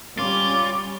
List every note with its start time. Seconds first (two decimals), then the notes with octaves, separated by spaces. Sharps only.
0.19 G3 C#4 F4 D6